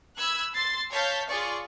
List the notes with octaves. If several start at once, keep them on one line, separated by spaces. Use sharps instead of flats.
B5 E6 F#6 G#6
C6 A6 C7
C#5 F5 A5 G6 B6
F4 G#4 D5 C#6